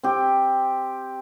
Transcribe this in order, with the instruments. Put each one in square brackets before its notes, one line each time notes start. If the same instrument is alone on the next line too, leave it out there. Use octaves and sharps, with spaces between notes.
[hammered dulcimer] C4 G4